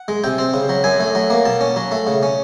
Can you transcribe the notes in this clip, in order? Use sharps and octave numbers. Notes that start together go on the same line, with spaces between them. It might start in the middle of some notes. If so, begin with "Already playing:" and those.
Already playing: F#5
G#3
C3 G5
C4
C#3
F#3
F#2 G#5
A3
F#3
A#3
B2 A5
C#4
F#3
A3
C#3
C#4